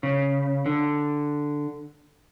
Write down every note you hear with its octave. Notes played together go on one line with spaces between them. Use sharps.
C#3
D3